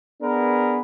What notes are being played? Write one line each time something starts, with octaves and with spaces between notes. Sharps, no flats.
B3 D4 G#4 A#4 B4